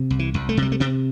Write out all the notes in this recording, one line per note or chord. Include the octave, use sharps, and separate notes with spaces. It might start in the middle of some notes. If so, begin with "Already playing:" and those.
Already playing: C3
C2
E3
C2
A3
C3
G3
A3
C3 C4